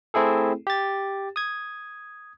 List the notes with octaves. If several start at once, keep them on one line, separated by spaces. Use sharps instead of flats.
A3 C4 E4 G#4 A4
G4 A6
D#6 G#6